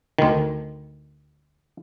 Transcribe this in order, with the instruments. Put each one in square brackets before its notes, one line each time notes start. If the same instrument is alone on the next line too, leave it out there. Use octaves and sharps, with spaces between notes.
[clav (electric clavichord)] D2 D#3